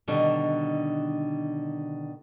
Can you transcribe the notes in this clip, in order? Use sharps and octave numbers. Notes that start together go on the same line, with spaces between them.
B2 D3 D#3 G3